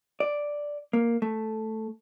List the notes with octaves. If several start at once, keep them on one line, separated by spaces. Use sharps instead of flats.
D5
A#3
A3